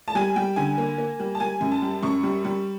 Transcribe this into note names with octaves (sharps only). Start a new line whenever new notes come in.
A5
G3 G#5
G3 G5
D3 G#5
A#3
A#3
G3
A5
G3 G#5
F#2
A5
G3
F#2 C#6
G3
G3